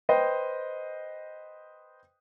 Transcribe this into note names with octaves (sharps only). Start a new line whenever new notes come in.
B4 C5 D#5 G5